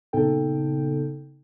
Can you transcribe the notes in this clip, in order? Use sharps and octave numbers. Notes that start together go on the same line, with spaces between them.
A#2 C#3 B3 D#4 A4 G5